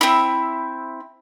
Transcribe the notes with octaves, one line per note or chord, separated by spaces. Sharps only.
C4 E4